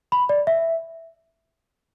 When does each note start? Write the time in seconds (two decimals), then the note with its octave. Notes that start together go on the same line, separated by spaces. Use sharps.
0.12 B5
0.29 D5
0.47 E5